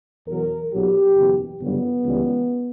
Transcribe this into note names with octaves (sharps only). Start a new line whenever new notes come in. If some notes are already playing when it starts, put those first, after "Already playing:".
E2 B2 F#3 A#4
B1 A#2 F#3 G4
F#1 E2 B2
G1 F#2 C#3 G3 B3
C#2 C#3 E3 G3